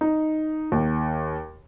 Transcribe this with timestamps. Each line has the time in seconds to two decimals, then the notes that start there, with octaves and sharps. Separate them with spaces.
0.01 D#4
0.72 D#2